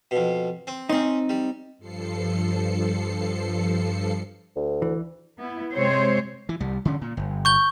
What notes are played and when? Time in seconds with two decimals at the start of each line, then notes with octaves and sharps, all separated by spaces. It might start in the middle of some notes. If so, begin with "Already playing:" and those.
0.11 F2 B2
0.67 C4
0.89 C4 C#4 D#4 C5
1.29 G3
1.78 G2 F3 A4 C7 C#7
4.56 D2
4.82 E3
5.38 B3 E4
5.74 C3 G#3 C4 C5 C#5
6.49 E3
6.60 C2 G3
6.85 D3 C#4
7.01 A#2
7.17 G1
7.45 C#6 G6 G7